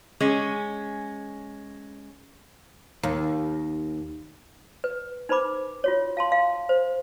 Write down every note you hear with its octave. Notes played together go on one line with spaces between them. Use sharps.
G#3 C#4
D#2
B4
D#4 B4 C5 B5 D6
F4 F#4 C#5
F5 A5 C6
F5
C5